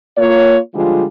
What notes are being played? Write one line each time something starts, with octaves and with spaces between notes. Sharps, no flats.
A#3 F4 C#5
D3 F3 G3 G#3 F4